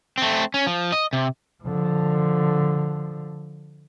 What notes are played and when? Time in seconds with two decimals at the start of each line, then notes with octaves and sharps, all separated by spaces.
0.18 A3 C4
0.54 C#4
0.67 F3
0.92 D#5
1.13 C3
1.63 D3 F3